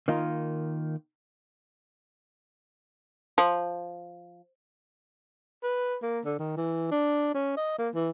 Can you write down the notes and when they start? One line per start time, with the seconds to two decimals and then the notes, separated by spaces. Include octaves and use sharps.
0.08 D#3 A#3 D#4 F4
3.38 F3
5.63 B4
6.02 A#3
6.25 D3
6.39 D#3
6.57 E3
6.91 D4
7.34 C#4
7.57 D#5
7.78 A#3
7.95 E3